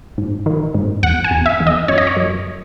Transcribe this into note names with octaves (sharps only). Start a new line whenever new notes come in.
G#2
D#3
G#2
E2 F#5
G#5
E2
E5
E2
D#5
F#2 C#5
D#5
C#5
F#2